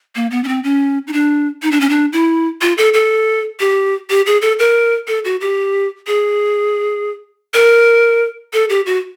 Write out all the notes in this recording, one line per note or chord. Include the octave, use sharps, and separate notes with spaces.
A#3
B3
C#4
C4
C#4
D#4
D4
D#4
D4
C#4
D4
E4
F4
A4
A4
G4
G4
G#4
A4
A#4
A4
F#4
G4
G#4
A#4
A4
G4
F#4